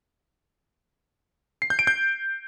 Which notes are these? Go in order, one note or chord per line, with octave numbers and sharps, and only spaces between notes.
C7
G6
D7
G6